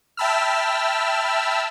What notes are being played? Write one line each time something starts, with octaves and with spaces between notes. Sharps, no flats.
E5 G5 A5 B5 E6 F6